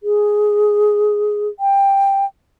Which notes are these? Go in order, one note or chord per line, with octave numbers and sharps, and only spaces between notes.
G#4
G5